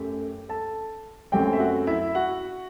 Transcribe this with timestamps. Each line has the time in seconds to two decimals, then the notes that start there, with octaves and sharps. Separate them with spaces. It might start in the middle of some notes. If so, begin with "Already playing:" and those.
Already playing: F#2 A3 G4
0.49 A4 A5
1.32 F#2 F#3 A3 C4 G4 G5
1.53 E5
1.60 F#4 F#5
1.87 E4 E5
2.15 F#4 F#5